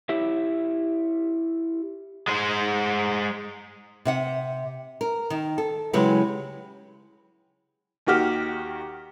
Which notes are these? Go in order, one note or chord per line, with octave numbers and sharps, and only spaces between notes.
E4 G4 C#5 E5
G#3 C5
C3 E5 F#5
A#4
D#3
A4
C#3 F#3 G#3 E4 G4 B4
D#2 D#3 F#4 G4 F6